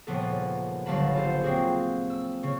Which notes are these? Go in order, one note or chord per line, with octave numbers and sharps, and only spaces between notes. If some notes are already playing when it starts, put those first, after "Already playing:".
D#1 D#2 C#3 F3 B3 A4
G1 F#3 F5 A5 B5
F4 A4 C5
A#3 C4 F#4 G#4
E6
C#3 C#4